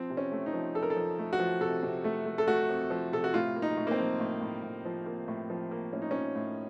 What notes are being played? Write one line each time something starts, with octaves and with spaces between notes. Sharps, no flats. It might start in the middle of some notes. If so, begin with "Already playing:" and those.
Already playing: F3 C4
C3
C#4
A3
D#4
F3
F2 A4
A#4
A4
F3
A3
F#4
F3
C3 A4
C3
A3
A3
A4
A3 F#4
F2
F3
C3 A4
F#4
A2 F4
A#3
D#4
A2
A#3
C4
F3
A2
A2
A2
F3
A#3
A2
F3
A#3
A2 C#4
D#4
F3 C#4
A2